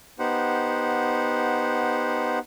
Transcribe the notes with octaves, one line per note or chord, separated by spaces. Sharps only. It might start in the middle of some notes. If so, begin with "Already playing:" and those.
B3 D#4 G4 C5 F#5